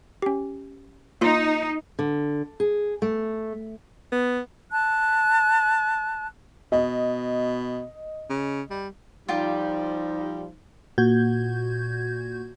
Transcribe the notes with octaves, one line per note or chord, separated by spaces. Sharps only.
C#4 G4
A#3 D#4 F4 C6
D3
G#4
A3
B3
A5 F#6
B2 D#5
C#3
G3
F3 G3 D#4 F4 G4
A#2 F#4 G6 G#6